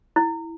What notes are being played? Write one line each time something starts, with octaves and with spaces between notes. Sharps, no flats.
E4